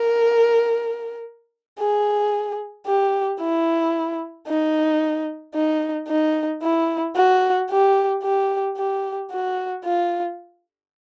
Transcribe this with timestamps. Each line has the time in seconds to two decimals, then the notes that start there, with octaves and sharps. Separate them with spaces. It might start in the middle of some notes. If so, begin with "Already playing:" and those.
Already playing: A#4
1.79 G#4
2.87 G4
3.40 E4
4.47 D#4
5.54 D#4
6.08 D#4
6.62 E4
7.16 F#4
7.70 G4
8.23 G4
8.78 G4
9.31 F#4
9.84 F4